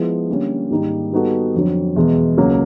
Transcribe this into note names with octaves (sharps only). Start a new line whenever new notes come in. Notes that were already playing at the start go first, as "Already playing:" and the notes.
Already playing: F3 G#3 B3 E4
D3 G3 A#3 C#4
G#2 D#3 G3 A#3 D#4
G3 B3 D#4 F#4 A4
F2 D3 F#3
E2 B2 G#3
C#2 C#3 F#3 A#3